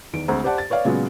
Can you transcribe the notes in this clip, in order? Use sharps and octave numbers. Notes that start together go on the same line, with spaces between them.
E2 D#3 D7
D2 G#3 C4 A#5
G4 C5 D5 F#5 A5
A6
B4 C#5 D5 F5
A#2 C#3 F#3 G#3 B3